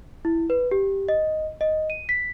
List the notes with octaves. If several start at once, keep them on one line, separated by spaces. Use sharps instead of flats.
E4
B4
G4
D#5
D#5
D#7
B6